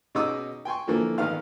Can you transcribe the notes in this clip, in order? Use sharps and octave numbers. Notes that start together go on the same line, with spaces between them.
B2 C#4 D#4 G#4 D6 E6
G5 G#5 C6 C#6
D3 E3 F3 A#3
A1 D#3 B3 F5 F6